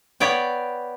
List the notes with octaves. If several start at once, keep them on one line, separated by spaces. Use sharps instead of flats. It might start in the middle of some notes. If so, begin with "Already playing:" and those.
B3 C#5 D5 G5